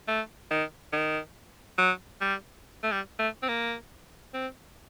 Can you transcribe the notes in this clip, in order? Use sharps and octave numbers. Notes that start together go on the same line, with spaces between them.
A3
D#3
D#3
F#3
G3
A3
G3
A3
C4
A#3
C4